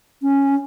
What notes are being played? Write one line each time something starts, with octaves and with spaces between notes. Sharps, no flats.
C#4